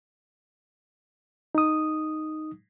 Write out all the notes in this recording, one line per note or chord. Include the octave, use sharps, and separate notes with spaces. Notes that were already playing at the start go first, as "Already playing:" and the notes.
D#4 D#6